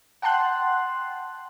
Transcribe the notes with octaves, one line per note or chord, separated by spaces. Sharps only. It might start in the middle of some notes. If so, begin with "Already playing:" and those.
F#5 G5 A5 C6 F#6